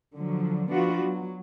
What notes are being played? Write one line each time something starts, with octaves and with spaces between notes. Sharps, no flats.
D3 F3 F#3
F3 B3 D4 F4 F#4
F#3